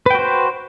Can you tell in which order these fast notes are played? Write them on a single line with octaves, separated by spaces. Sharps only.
B4 G5 F#4 C5